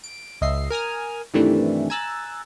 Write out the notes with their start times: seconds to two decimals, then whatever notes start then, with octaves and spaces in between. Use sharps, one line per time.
0.04 D7
0.41 C#2 D#5 E5 C7
0.70 A#4 G#5 D#6 F6
1.34 G2 C3 D#3 E3 A3 D4
1.90 G#5 A#5 E6 F#6 A6